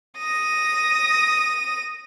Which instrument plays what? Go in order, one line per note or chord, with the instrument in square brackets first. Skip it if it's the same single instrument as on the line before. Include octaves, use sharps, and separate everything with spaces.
[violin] D#6 A#6